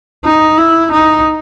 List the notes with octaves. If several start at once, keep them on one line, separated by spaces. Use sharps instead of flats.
D#4
E4
D#4